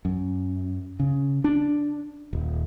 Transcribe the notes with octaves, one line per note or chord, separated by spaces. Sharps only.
F#2
C#3
D4
D#1